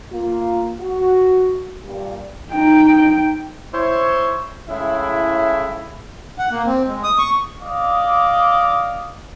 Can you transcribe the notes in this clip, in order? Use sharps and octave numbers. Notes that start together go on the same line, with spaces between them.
A#3 F4
F#4
G2 A#2 G3
D#4 G5
E4 C5 C#5
A2 C#3 G#3 E4
F#5
A#3
C4
G#3
D#6
C#6
D5 D#5 F5 D6 D#6